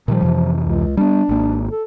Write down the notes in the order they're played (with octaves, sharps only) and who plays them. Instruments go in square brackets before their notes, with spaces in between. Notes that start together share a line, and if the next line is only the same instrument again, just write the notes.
[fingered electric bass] A#2 D#3 G3 [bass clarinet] F3
[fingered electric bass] F2 C3 E3
[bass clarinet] C#2
[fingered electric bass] G3 B3 [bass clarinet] D4
[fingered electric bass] G#1 A#3
[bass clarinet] A4